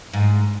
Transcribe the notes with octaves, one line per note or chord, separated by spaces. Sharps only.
G#2